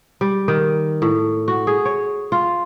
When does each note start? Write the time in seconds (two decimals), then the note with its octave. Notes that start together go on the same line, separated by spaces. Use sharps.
0.21 G3
0.48 D#3
1.02 A2
1.48 F#4
1.67 G#4
1.85 C#5
2.32 F4